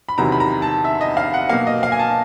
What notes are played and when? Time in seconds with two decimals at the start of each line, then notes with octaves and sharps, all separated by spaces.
0.09 B5
0.18 E2 C3 D#3 F#3 A#5
0.32 B5
0.40 A#5
0.62 A5
0.84 E5
1.01 D#5
1.17 F5
1.34 F#5
1.49 B2 F#3 A#3 F5
1.67 D#5
1.83 F5
1.92 G#5
1.99 A5